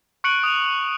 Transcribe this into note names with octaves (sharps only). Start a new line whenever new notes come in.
C#6 F#6 C#7 D7 F#7
D#6 F7